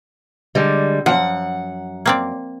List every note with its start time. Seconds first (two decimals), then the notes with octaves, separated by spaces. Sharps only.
0.55 D3 G3 G#3
1.06 F#2 F3 F#5
2.06 A#3 C4 D5